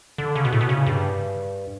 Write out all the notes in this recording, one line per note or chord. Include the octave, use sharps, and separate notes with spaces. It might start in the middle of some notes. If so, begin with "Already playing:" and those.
D3
C#3
B2
A2
B2
C#3
G2